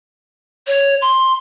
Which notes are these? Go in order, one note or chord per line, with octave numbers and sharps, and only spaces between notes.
C#5
C6